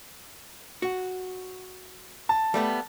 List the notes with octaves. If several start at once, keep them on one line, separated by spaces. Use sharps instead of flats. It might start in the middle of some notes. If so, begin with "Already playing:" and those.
F#4
A5
G3 A3 B3